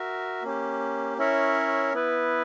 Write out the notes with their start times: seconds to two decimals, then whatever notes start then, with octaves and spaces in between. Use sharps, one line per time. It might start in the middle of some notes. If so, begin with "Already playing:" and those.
Already playing: F#4 A#4 E5
0.43 A#3 C#4 G4
1.18 C#4 E4 A#4 C#5 E5
1.94 B3 E4 B4